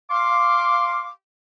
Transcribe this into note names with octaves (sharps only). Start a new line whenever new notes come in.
F5 C6 D6